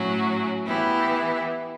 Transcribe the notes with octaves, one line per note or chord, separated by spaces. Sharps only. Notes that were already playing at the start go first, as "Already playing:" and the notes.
Already playing: A2 F#3 C#4 F#4
E3 B3 E4 G4